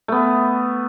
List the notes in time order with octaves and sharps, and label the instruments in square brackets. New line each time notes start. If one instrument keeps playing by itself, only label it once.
[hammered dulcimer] A3 B3